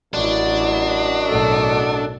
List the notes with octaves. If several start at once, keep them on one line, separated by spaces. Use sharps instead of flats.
A1 F#2 D4 E4 F#4 D#5
B1 A2 A4